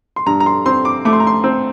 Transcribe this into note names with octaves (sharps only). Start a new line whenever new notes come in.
C6
G2 A#5
A#5
C6
C4 C6
D6
A3 D6
C6
A#5
C6
C4